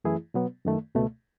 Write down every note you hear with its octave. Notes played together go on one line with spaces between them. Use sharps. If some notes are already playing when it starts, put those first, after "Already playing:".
F#2 E3 A3 E4 G#4
B2 F#3 B3
F#2 D#3 A3
C#2 B2 A3